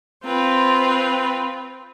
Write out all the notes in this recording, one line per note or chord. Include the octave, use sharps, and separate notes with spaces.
C4 F4 B4